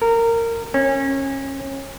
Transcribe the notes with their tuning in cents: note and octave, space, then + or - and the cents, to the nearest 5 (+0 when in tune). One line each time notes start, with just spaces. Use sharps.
A#4 -20
C#4 -25